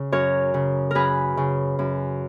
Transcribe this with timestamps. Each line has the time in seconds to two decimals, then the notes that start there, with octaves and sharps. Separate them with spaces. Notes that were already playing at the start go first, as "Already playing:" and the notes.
Already playing: C#3
0.12 F#2 A#4 C#5
0.54 C#3
0.91 F#2 G#4 A#4 B4
1.37 C#3
1.79 F#2